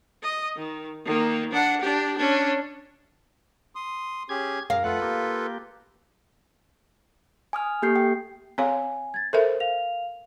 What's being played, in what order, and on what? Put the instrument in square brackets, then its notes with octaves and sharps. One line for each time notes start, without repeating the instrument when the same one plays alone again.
[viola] D#5
D#3
D#3 A#3
D4 F#5
D4 G4
C#4 D4
[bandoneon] C6 D#6
[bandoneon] C#4 G4 G#4 [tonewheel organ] G#6
[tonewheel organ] F#2 A#4 [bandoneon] G#4 [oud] F5
[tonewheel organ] F2 A3 F#5 [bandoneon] F4 A4 B4
[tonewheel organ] A#3 G4
[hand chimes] G#5 D#6 F6
A#3 G4 A4 G6 C7
G5
[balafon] C4 C#5 F5 [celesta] G#5
[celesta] G#6 A6
[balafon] A4 A#4 E5 [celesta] C5
[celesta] F5 F7